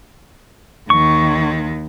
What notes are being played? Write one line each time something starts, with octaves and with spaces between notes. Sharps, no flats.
D#2 D#3 C#6